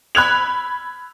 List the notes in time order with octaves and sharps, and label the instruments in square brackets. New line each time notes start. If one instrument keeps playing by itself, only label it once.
[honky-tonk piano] B5 F#6 G#6 F7